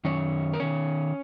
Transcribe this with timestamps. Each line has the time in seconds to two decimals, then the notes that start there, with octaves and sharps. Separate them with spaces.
0.05 F#2 D#3 C#4 C#5
0.53 A#4
0.60 D#3 C#4 C#5